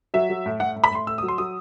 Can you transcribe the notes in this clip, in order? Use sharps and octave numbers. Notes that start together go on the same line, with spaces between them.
F#3 E5
F#3
A2
A2 F#5
A2
B5
A2 C6
A2 E6
F#3 D#6
C6
F#3 D#6